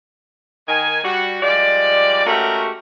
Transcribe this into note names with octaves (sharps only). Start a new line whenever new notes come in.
D#3 G#5
G3 F#4
F3 G3 G#3 D5
G#3 A3 C#4 F#4 G4 A#4